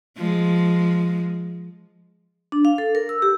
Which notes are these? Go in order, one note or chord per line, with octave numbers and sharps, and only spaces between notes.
F3 G#3
D4
F5
A4
A#4
E6
G4